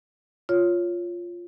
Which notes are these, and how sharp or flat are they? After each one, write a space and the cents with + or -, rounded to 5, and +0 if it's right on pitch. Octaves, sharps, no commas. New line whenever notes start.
F4 +0 C#5 +0